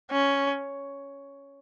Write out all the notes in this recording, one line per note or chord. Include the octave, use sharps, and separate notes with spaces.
C#4